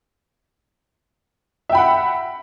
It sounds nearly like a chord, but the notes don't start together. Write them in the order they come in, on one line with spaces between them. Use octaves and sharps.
E5 G5 B5 F#5